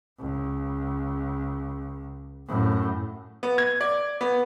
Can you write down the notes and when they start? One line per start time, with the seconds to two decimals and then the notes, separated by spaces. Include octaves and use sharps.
0.19 C#2
2.47 F#2 A2
3.43 B3
3.58 G#6
3.81 D5
4.21 B3